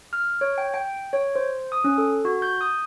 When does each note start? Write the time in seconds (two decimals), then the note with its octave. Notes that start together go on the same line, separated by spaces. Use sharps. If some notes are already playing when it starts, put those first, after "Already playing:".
0.13 F6
0.41 C#5
0.58 G5
0.74 G5
1.13 C#5
1.35 C5
1.72 D#6
1.84 C#4
1.98 A4
2.25 F#4
2.42 G6
2.61 D#6